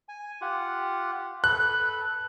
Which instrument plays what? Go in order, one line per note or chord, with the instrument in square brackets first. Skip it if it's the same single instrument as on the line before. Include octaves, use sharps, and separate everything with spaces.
[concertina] G#5
F4 G4 F#5
[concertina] A4 B4 [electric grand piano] F#6